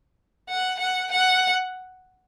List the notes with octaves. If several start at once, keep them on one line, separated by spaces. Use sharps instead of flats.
F#5
F#5
F#5